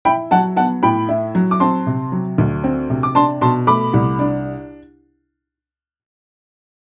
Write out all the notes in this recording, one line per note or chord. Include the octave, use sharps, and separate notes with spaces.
E4 G5 B5
F#3 F#5 A5
B3 F#5 A5
A2 G5 B5
E4
F#3
D6
C4 A5 C6
C3
F#3
D2
C4
C3
D6
D4 A5 C6
B2 A5 C6
A3 B5 D6
C2
D4